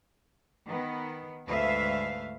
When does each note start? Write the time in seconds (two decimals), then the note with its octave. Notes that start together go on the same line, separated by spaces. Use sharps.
0.65 D#3 B3
1.48 D2 G#2 A3 B4 E5 F5